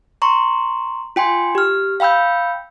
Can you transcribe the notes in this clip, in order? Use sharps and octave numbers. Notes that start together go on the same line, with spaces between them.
A#5 C6 C#6
F4 G5 G#5 C6
G4 F6
F5 G5 B5 E6 G6